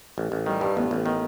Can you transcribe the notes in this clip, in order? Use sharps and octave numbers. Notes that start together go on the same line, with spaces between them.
A1
A1
D#3 G3
G2
A1 B3
A1
D#3